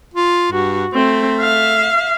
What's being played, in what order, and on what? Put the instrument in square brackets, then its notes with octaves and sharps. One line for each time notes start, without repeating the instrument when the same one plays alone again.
[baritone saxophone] F4
[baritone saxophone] G2 [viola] F#4
[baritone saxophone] A3 [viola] C4
[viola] E5 F5